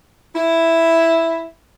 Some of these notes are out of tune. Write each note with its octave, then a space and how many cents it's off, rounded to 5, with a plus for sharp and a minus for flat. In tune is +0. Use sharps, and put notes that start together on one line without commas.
E4 +0